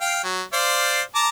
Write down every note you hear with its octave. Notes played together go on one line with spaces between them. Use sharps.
F5 G5
F#3
C5 D5 F5
A5 A#5 D6